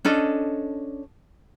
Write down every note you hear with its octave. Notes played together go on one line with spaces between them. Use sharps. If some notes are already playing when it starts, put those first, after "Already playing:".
C#4 D4 A4 D#5